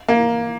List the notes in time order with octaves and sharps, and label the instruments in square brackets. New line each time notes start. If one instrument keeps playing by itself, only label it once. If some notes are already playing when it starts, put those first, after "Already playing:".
[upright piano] A#3